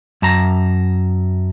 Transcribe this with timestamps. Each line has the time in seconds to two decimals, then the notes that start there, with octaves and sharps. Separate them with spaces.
0.22 F#2 A5 A#5